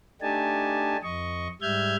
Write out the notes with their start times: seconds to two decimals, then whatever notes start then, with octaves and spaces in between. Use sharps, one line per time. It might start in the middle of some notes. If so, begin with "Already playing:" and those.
0.21 A3 D4 D#4 G4 G#5 A5
1.03 F2 D#5 C#6
1.61 G#2 G3 E5 F6 G6 G#6